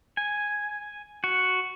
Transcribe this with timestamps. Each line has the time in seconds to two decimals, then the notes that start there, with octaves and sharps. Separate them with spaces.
0.17 G#5
1.24 F#4